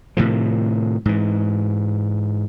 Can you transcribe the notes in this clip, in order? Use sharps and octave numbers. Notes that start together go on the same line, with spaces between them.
A2 C3 D#3 F3
G#2 E3